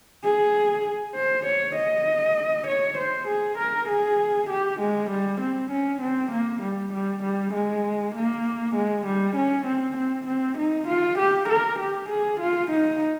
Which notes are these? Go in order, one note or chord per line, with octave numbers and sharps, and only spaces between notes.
G#4
C5
C#5
D#5
C#5
C5
G#4
A#4
G#4
G4
G#3
G3
C4
C#4
C4
A#3
G3
G3
G3
G#3
A#3
G#3
G3
C#4
C4
C4
C4
D#4
F4
G4
A#4
G4
G#4
F4
D#4